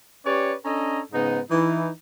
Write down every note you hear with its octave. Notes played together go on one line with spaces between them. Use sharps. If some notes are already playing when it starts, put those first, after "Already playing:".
C#4 G4 B4 C#5 D5
C#4 D4 A4 D#5 A#5
G#2 C#3 B3 D#4
E3 D#4